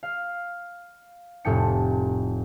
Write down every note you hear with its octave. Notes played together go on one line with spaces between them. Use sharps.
F5
F1 A2 A4 G5 C#7